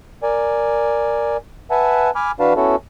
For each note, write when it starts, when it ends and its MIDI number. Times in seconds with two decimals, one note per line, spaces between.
0.23 1.37 70
0.23 1.37 74
0.23 1.37 80
1.71 2.11 71
1.71 2.11 76
1.71 2.11 78
1.71 2.11 80
1.71 2.11 81
2.16 2.31 80
2.16 2.31 83
2.16 2.31 86
2.16 2.31 89
2.40 2.53 52
2.40 2.53 62
2.40 2.53 66
2.40 2.53 71
2.40 2.53 77
2.40 2.53 81
2.56 2.76 59
2.56 2.76 61
2.56 2.76 64
2.56 2.76 66
2.56 2.76 69